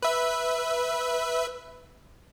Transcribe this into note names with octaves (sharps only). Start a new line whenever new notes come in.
B4 E5